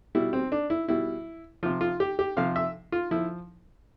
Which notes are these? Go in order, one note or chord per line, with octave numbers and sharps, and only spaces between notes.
B2 G3 E4
C4
D4
E4
B2 G3 E4
C3 F3 F4
F4
G4
G4
C3 F3 F5
E5
F4
F3 E4